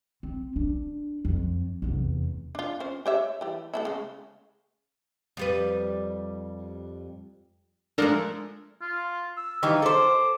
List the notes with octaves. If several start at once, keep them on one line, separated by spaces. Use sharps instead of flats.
C4
D4
F2
F1 E2
D4 F4
C#4 C5
G4 C#5 E5
E3 G3
A3 D4 E4
C#3 G#3
F2 G3 B4
F3 G#3 A3 D4 A4 A#4
F4
E6
D#3 E3 G3 F5
A4 C5 D6